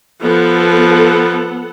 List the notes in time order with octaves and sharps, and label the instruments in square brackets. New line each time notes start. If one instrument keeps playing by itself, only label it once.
[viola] F3 [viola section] B3 A4 F#5